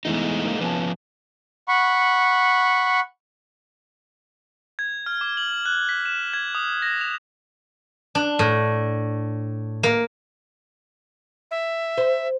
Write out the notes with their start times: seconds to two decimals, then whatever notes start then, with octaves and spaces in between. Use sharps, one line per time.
0.05 E2 E3 G#3 A3 D#4
0.45 A#3
0.61 F3 B3 C#4 B4 G#5 A5
1.68 F#5 B5 C#6
4.79 G#6
5.06 F6
5.21 D6
5.37 F#7
5.66 F#6
5.89 B6
6.05 E7
6.33 G#6
6.55 D#6
6.82 A#6
7.01 F7
8.15 D4
8.39 A2
9.83 A#3
11.51 E5
11.98 C5